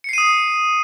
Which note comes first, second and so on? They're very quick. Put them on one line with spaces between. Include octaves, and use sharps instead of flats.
C#7 C7 D#7 D#6